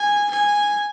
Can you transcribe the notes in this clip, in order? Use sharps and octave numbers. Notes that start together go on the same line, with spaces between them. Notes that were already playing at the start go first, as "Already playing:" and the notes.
Already playing: G#5
G#5